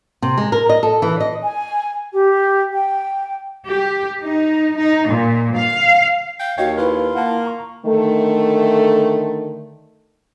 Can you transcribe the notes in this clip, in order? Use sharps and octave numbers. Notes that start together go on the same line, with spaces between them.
C3
G#3
A#4
D#5
A4
E3
D#5
G#5
G4
G5
G4
D#4
D#4
A#2
F5
F5 G5
D#2 F#4 C#5 D#5 F5 G5
E4 F4 B4
A#3 F#5 A5
A#5 C#6
D3 D#3 A3